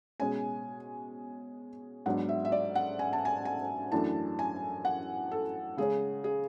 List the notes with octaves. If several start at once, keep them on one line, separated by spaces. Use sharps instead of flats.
B2 G#3 C#4 G#5
G#2 F#3 B3 D4 F#5
E5
E5
D5
F#5
G#5
A5
G#5
G#5
F#2 E3 A3 D4 A5
G#5
F#5
A4
C#3 G#3 C#4 G#4
G#4